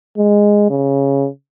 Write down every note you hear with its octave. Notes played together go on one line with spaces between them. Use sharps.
G#3
C#3